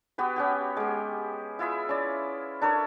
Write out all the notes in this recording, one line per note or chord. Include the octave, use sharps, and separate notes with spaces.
B3 F#4 G4 B4
C#4 F#4 G4
G#3 G4
E4 F4 G#4 E5
C#4 D5
D4 A4 A#4 C#5